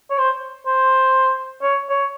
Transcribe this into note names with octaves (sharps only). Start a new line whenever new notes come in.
C#5
C5
C5
C#5
C#5